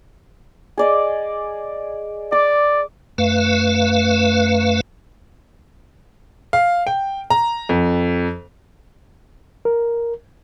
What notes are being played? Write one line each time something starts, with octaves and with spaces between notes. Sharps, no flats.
G#4 D5 D#5
D5 D6
F#2 A3 B4 F5
F5
G5
A#5
F2
A#4